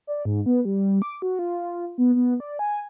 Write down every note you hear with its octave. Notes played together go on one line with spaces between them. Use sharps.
D5
G#2
B3
G3
D6
F#4
F4
B3
B3
D5
G#5